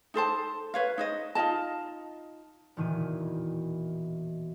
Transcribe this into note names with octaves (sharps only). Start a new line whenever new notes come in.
D#4 A4 C5 A5
B4 C#5 F5
D#4 C5 D#5
D#4 F4 D#5 A5
E1 A#2 D#3 E3 D#7